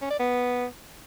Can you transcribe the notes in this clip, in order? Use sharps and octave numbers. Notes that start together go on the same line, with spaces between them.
C#4
D5
B3